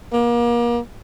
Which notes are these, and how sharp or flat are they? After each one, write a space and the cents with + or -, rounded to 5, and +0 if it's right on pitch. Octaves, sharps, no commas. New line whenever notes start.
A#3 +35